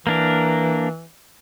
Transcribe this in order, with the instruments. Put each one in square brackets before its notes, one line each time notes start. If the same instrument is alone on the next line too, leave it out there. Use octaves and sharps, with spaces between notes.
[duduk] E3 [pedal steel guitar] A#3 D4 A#4